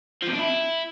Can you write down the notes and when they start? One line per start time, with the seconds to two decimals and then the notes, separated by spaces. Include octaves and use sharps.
0.22 F3
0.28 C3
0.33 D4
0.39 E4